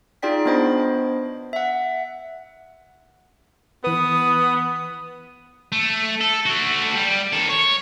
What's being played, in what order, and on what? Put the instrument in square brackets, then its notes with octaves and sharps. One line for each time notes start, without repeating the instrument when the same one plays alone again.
[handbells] D#4 F4 G#4 D5 G5 B6
B3 D4 C5 D#5 B5
E5 F#5
[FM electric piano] E3 B4 [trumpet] B3 [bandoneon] D#6
[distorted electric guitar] A3
A4
A3 F#4
G3
D#3 A4
C#5